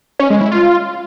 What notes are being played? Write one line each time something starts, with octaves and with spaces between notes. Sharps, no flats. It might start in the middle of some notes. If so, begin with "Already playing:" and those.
C#4
G#3
E4
F4